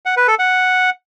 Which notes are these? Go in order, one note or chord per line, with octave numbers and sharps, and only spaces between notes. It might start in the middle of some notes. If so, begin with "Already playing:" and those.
F#5
B4
A4
F#5